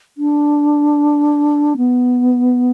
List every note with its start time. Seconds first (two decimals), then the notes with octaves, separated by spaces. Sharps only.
0.18 D4
1.77 B3